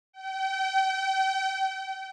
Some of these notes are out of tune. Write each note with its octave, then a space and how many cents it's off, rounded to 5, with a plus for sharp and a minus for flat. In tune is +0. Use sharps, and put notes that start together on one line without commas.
G5 -35